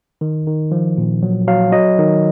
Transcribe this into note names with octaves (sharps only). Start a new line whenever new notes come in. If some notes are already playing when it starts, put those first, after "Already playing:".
D#3
D#3
F3
A#2
F#3
F#3 F5
F#3 D#5
D#3